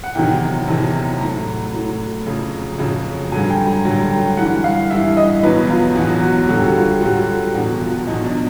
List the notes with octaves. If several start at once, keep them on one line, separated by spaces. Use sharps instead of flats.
F#5
E2 C3 D#3 F#3 G5
E2 C3 D#3 F#3 A5
A2 F#3 A#5
A2 F#3
F2 C#3 F#3
F2 C#3 F#3
G2 D3 F#3 G#5
G5
A#5
G2 D3 F#3
G5
G2 E3 F#5
F5
G2 E3 E5
D#5
E2 B2 F#3 B4
F4
E2 B2 F#3 F#4
F#4
G2 D3 F#3 F#4
G4
F#4
F4
G4
G2 D3 F#3 F#4
G4
E2 B2 F#3 F#4
F4
E2 B2 F#3 D#4
D4